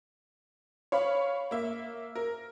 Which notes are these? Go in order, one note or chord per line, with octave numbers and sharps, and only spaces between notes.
C#5 F5 B5
A#3 E5
A#4